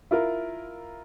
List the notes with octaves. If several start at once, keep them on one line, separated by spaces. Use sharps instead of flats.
E4 F4 A#4